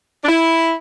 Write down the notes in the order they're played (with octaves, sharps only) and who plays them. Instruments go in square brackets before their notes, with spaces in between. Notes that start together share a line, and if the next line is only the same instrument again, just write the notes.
[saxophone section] D4
E4